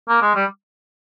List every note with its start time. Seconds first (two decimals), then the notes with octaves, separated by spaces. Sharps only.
0.09 A#3
0.22 G#3
0.35 G3